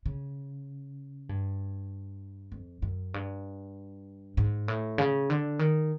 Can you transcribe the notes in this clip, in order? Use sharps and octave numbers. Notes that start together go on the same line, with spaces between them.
C#3
G2
F2
F#2
G2
G#2
A2
C#3
D3
D#3